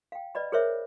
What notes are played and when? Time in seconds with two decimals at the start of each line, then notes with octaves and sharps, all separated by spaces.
0.12 F5 G5
0.35 B4 D5 D#5 B5
0.52 G#4 A#4 C5 C#5 E5